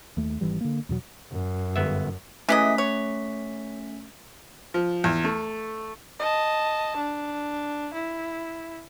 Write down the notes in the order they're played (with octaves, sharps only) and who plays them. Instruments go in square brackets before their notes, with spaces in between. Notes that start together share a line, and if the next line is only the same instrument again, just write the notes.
[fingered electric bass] D#2 A3
G#1 E3 G3
D3 A#3
E2 B2 F#3
[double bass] F#2
[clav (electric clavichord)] G1 B3 E5
[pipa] E3 G#3 D#5 [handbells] A3 C#4 B6
[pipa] C#5
[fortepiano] F3
E2
A3
[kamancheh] D#5 A5
D4
E4